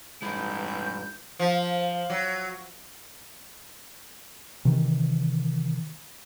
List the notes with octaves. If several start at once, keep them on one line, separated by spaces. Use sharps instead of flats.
A1 G2 G#3 E4 G6
F3
F#3
C3 D#3 E3